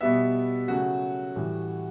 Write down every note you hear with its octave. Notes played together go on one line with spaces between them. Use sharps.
B2 G3 B3 E5
C#3 F#3 A3 F#4
A2 E3 G3